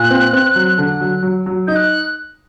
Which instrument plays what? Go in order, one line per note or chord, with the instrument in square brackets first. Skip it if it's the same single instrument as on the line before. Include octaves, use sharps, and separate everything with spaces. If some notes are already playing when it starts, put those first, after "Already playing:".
Already playing: [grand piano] A#2 [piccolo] F#6
[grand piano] C4
C4
F#3
D3
F#3
F#3
F#3
[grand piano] D#4 [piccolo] G6
[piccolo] F#6